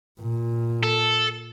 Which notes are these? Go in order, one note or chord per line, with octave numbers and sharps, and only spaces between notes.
A#2
A4